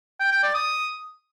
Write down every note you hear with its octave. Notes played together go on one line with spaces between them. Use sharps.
G5
G5
D5
D#6